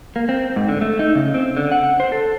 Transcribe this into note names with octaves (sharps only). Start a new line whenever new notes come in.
A#3
C4
G#2
D3
A3
D#4
C#3
C4
D3
F#5
C5
A4